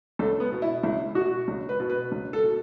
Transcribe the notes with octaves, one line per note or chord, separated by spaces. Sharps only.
C#2 A4
B3
B2
E4
C#2 E4
B2 F#4
C#2
B4
B2
B4
C#2
A4
B2